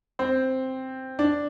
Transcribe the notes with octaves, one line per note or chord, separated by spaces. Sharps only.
C4
D4